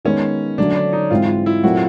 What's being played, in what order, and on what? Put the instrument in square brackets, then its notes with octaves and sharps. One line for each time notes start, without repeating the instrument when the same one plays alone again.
[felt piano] D#3 G#3 B3 [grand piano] C#4
[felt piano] D3 F#3 A3 [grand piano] D4
[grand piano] D4
D#4
[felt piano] G#2 E3 G#3 C4 [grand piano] F4
[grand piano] F4
E4
[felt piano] A#2 F#3 A3 C4 [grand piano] F#4